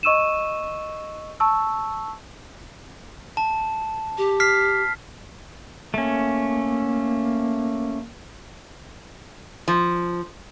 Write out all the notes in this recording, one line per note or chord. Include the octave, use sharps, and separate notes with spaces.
D#5 C#6 E6 D#7 E7
A5 C#6 E6
A5
G4
F6 B6 C7
A3 A#3 C#4
F3